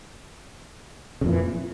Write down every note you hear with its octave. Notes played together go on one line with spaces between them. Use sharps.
F2 A#2 C#3 E3